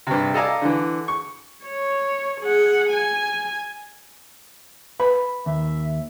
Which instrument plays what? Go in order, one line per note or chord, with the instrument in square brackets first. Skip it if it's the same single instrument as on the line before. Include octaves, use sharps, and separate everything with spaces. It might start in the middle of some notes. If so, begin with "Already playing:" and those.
[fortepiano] G2 C3
A4 D5 D#5 F5 G#5 A#5
D3 E3
C#6
[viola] C#5
G#4 F#5
G#5
[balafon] B4 [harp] B5
[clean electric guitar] D#2 [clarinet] E5